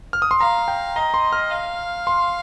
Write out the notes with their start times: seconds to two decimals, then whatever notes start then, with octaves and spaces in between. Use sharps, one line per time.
0.13 F6
0.22 D#6
0.31 C6
0.40 F5 A#5
0.68 G5
0.96 D#5 A#5
1.14 C6
1.32 F6
1.51 F5
2.07 C6